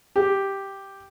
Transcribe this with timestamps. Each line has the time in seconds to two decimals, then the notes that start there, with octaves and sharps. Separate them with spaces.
0.16 G4